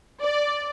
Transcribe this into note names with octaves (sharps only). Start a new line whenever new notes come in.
D5